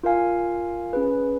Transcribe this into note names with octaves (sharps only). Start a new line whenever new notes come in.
F4 A#4 F5 G#5
C#4 G#4 B4